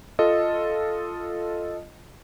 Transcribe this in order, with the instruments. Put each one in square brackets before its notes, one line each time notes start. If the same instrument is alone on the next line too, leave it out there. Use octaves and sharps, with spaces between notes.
[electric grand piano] F4 A4 D#5